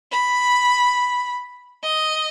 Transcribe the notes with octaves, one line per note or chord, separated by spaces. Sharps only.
B5
D#5